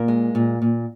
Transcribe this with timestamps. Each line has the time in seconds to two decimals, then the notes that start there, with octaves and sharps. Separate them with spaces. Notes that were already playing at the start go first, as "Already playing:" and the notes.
Already playing: A#2 A#3 A#4
0.08 G#3
0.35 A#2
0.62 A#2